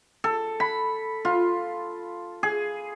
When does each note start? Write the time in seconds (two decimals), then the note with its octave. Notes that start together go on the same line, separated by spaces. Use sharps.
0.24 A4
0.60 B5
1.25 F4
2.43 G#4